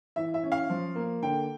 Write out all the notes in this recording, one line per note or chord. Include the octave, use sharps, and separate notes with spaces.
E3 E5
E5
C#4
F5
F3
A#3
D3 G5